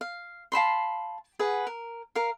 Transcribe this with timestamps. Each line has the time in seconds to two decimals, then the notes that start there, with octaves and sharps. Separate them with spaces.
0.01 F5
0.52 F5 A5 B5 C6
1.39 G#4 B4 F#5
1.67 A#4
2.15 A#4 F5